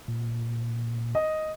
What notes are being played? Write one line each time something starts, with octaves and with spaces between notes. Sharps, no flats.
A#2
D#5